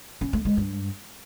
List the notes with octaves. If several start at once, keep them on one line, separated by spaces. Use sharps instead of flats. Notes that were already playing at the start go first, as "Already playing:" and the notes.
C#4
A3
G#3
G2